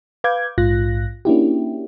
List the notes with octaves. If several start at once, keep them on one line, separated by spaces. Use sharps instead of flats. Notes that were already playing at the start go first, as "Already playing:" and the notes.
B4 F5 D6 G6 G#6
A#1 G#2 F4 F#6 A#6
A#3 C#4 D4 E4 F#4 G4